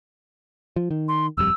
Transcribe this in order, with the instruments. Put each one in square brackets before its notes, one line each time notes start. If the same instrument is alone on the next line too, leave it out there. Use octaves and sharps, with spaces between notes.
[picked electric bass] F3
D#3
[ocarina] C6
[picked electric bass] D#1 F2 G3 [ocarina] E6